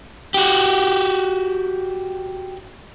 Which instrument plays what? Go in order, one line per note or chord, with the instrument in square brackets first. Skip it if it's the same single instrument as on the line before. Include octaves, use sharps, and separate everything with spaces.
[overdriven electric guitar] F#4 G4